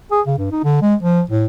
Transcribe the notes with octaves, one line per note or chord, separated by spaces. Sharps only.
G#4
C#3
G2
D#4
D3
G#3
F3
A2